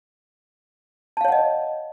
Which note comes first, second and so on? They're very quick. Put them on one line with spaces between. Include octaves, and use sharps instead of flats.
A5 F5 C#5 F#5 D#5